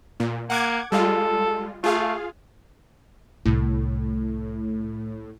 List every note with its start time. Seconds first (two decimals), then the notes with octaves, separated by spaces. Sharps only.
0.20 A#2
0.50 A#3 F#5 D6 G#6
0.92 G3 G#3 F4 A4
1.84 A3 F4 G#4 F5
3.45 C2 A2